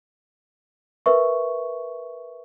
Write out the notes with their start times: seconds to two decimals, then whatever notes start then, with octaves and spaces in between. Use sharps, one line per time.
1.06 A#4 B4 E5 C#6